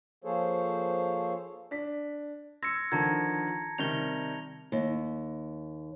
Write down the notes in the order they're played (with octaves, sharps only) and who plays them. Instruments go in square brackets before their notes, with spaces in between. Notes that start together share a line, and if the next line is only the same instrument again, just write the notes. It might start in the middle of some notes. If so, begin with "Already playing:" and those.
[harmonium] F3 A#3 G#4 A4 C5 C#5
[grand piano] D4 B6
[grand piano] C6 E6 G#6 [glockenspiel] A#6 C#7
[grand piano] D3 D#3 F3 [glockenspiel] A5 A#5 G#6
[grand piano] C3 D#3 G3 [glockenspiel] F7 G7
[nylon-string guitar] D#2